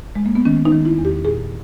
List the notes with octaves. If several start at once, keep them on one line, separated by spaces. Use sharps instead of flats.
G#3
A#3
B3
D#3 C#4
D#4
D#3
E4
E2
G4
A#2 G#4